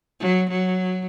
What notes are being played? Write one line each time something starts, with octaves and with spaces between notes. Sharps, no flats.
F#3
F#3